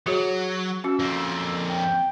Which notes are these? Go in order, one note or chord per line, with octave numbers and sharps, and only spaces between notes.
F#3 F#4 G#4 C#5
C#4 F#4 E6
F2 A#3
G5